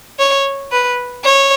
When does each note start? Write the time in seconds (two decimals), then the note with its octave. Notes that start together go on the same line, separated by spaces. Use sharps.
0.19 C#5
0.72 B4
1.24 C#5